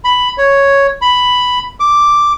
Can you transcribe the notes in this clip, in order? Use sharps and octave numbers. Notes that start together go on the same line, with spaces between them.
B5
C#5
B5
D6